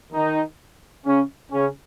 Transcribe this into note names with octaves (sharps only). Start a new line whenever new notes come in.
D#3 D#4
C#3 C#4
C#3 C#4